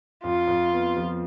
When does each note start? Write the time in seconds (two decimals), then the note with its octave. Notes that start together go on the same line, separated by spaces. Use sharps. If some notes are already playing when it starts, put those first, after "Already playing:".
0.23 F2 F4
0.47 F2
0.72 B3
0.96 F3